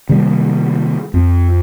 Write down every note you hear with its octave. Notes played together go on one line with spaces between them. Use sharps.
C3 D#3 G3 A#3
F2